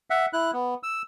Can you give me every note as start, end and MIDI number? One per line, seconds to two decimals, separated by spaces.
0.10 0.26 76
0.10 0.26 78
0.33 0.51 64
0.33 0.51 90
0.53 0.74 59
0.83 1.02 88